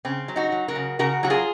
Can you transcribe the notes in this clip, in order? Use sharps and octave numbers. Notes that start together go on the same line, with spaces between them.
C#3 C4
F#3
D#4 F#4
F#3
F#4 A#4
C#3
C#3 F#4 A#4
F#3 F#4
F4 G#4